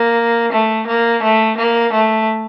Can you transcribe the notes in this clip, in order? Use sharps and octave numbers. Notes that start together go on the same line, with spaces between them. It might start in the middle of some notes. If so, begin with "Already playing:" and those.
Already playing: A#3
A3
A#3
A3
A#3
A3